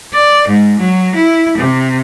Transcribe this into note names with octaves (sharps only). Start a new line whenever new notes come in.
D5
G#2
F#3
E4
C3